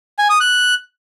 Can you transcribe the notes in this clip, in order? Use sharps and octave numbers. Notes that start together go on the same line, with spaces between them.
G#5
D#6
F#6